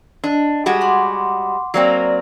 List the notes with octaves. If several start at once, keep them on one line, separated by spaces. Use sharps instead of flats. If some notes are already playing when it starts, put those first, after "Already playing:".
D4 D#5
G3 G#3 F#4
F#5 C6 D6
F#3 A#3 C4 D5